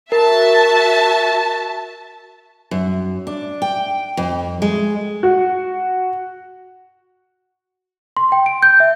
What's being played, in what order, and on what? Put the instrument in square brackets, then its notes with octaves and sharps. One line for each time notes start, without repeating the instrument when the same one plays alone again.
[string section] F#4 E5 A5 [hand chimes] A#4
[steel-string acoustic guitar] F#2
D4
G5
F2
G#3
[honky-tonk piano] F#4
[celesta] C6
G5
D7
G6
E5